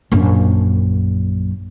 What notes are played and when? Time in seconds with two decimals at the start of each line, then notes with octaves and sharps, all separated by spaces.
0.12 A#1 F#2